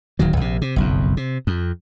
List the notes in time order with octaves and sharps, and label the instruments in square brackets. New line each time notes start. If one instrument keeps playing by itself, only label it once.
[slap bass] D1 D#3 F#3
A#1 C3
C3
F#1 B1 F2
C3
F2